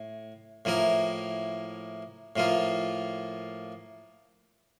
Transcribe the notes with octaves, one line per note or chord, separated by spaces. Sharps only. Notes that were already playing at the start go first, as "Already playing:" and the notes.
Already playing: A2
A2 F3 A#3 E4 A#4
A2 F3 A#3 F4